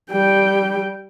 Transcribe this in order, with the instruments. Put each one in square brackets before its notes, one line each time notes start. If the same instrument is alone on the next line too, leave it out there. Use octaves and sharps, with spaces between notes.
[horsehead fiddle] G3 G5